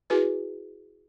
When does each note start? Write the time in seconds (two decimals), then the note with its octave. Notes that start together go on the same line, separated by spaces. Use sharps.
0.10 E4 F#4 G#4 B4 G#5